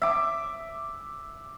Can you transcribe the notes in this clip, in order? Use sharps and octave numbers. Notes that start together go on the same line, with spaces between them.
E5 D6